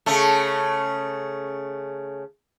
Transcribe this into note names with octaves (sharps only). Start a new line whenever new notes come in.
C#3 A3